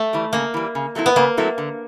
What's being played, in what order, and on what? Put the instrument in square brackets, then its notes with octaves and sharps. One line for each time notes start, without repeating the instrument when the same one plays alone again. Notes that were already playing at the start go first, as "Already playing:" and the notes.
Already playing: [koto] A3
[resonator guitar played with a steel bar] E3 G3
[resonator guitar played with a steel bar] C#3 [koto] A#3
[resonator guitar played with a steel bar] E3 G3
C#3
F#3 A3 C4 E4
[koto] B3
[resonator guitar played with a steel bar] C#3 [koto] A#3
[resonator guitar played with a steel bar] F#3 A3 C4 E4
D3